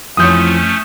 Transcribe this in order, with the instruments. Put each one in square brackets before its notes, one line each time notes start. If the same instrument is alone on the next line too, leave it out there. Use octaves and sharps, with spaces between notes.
[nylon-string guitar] F2 [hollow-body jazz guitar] E3 F3 C#5 [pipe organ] A3 C#4 [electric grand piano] D#6 G6